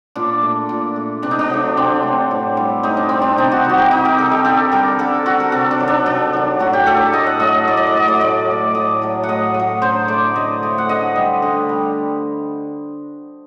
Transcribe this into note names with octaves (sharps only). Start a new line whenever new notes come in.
A#2 D4
A3
A#2
A3
C3 D4
D#4
D4
F#3 A3
C3 C4
A3
F#3
A2
G3
A2 D#4
D4
G3 C4
D4
C3 D#4
F#4
D#3 G3 F#4
G4
C3 D#4
A#4
D#3 G3 A4
G4
D3 A4
G3 A#4
D3 A4
G3 F#4
A#4
C3 A4
D4
D#3 F#3
D4
C3 D4
D#3 F#3
A2 F#4
G4
F#3 A3 A4
A2 D#5
F#5
F#3 A3 D#5
A2 D5
D#5
D5
F#3 A3 D#5
D5
D#5
A2 D5
F#3 A3
A2 D#5
F#3 A3
F#5
A2 D#5
A3
F#3
D3 C5
A3 D5
D3 D#5
A3
F#5
D3 D#5
G3
D3
G3